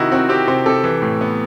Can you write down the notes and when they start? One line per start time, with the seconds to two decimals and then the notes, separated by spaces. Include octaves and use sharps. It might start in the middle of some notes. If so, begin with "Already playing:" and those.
Already playing: C3 D#3 D#4 E4 F#4
0.12 C4 F#4
0.29 C4 G4
0.47 C3 C5
0.66 C3 A4
0.84 E3
1.02 A2
1.21 B3